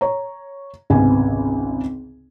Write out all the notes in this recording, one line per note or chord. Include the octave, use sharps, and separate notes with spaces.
C#5 A#5
G#1 C#2 C3 B3 G#5